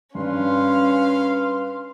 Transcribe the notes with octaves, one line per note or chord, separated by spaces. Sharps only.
G2 C#4 B4 F5 C6